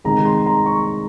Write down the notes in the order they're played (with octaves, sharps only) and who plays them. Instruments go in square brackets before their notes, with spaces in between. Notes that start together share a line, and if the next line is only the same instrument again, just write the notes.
[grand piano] C3 D#3 G#3 A#5
C6
A#5
C#6